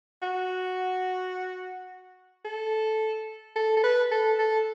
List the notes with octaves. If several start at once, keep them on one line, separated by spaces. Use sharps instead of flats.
F#4
A4
A4
A4
B4
A4
A4